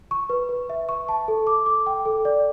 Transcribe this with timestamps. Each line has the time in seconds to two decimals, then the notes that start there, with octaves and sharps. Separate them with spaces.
0.11 C#6
0.30 B4
0.49 B4
0.70 E5
0.89 C#6
1.09 A5
1.28 A4
1.47 D6
1.66 D6
1.87 G5
2.05 A4
2.25 D5